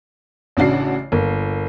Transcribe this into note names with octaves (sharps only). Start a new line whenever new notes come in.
A1 C#3 D4 F#4 C7
G1 A#3